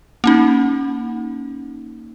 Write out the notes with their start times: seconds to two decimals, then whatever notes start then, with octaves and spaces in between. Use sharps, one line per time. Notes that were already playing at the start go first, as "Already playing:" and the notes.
0.24 A#3 C#4 D#4